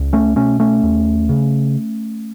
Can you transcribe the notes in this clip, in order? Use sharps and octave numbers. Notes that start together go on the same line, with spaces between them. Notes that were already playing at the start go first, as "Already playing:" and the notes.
Already playing: C#2
A3 C#4
B2 A3 C#4
A3 C#4
D#2
C#3